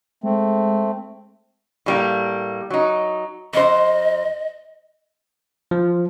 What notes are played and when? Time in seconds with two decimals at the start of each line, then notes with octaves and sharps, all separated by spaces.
0.24 G#3 A3 C4
1.86 A2 G3 A#3
2.70 F#3 D#4
3.53 F2 C5 D#5
5.71 F3